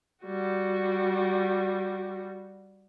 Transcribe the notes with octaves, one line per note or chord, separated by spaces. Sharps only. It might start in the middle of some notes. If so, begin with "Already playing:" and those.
G3 F#4